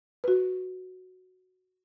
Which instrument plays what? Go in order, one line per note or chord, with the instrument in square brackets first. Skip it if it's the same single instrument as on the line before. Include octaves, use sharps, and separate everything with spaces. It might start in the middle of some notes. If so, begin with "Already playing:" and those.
[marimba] F#4 B4